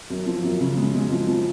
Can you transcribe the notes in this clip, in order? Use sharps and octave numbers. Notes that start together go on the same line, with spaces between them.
F#2
F3
F#2
C#3
G#3
G#3
F3
F3